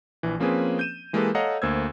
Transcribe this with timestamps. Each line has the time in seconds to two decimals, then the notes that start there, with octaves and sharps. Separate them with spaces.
0.23 A#1 E3
0.40 F3 A#3 C4 C#4 G#4 B4
0.79 G6 D#7 E7
1.13 E3 G#3 A#3 G4 A4 B4
1.35 A4 C#5 D#5 F5 F#5 A#5
1.62 D2 A#3 C5 E6 G#6